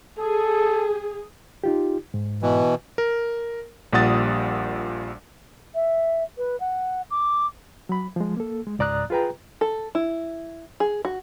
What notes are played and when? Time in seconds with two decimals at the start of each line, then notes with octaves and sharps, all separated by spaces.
0.18 G#4 A4
1.64 D#4 F4 G4
2.14 G#2
2.42 B2 E3
2.98 A#4
3.93 A#1 A#2 G3 F#5 D#6 A6
5.75 E5
6.38 B4
6.60 F#5
7.11 D6
7.89 F#3 B5
8.16 F3 G#3
8.37 A#3 A4
8.67 G#3
8.79 C#2 G#2 D5 A#5 D#6 F#6
9.10 F4 G#4 B4 G5 A#5
9.61 A4
9.95 E4
10.80 G#4
11.05 F#4